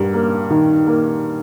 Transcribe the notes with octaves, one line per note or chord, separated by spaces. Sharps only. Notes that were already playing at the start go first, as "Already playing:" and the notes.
Already playing: G2 A#3
A#3
D#3
A#3